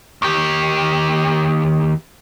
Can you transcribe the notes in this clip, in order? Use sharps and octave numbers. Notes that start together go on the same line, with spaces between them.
D#2 G4